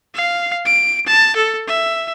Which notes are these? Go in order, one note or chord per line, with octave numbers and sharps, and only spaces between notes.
F5
D7
A5
A4
E5